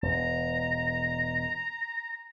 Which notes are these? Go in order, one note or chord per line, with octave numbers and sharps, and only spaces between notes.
E1 A#5